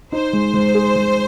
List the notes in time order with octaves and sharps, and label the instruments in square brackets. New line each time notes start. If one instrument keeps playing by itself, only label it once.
[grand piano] D#4 [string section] C5
[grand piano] G#3
G#3
G#4
G#3